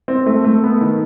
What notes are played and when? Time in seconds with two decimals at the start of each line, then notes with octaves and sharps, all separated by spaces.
0.08 C4
0.26 A3
0.44 A3
0.64 B3
0.81 D#3